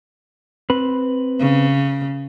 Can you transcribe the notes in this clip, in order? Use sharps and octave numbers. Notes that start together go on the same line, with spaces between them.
C4 B4
C#3